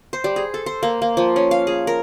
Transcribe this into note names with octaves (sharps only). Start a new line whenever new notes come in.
C5
G3
G#4
A4
C5
A#3
A#3
F3
C#4
F5
G#4
A#4